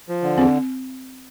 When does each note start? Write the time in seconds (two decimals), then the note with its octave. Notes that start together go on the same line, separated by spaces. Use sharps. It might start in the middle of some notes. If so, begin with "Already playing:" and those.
0.09 F3
0.23 D3
0.37 E2 C4